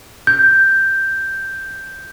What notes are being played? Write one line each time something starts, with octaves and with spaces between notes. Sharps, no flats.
G6